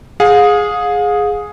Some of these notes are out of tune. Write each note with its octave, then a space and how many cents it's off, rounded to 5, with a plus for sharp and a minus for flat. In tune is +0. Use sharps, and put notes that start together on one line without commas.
G#4 +0 F5 +40